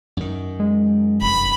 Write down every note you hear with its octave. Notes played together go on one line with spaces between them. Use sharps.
F#2 D#3
G#3
F1 B5